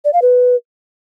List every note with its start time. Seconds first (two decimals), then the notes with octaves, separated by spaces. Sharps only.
0.05 D5
0.13 F5
0.22 B4